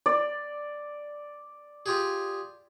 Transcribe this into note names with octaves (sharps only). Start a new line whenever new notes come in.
D5
F4 G4 G#4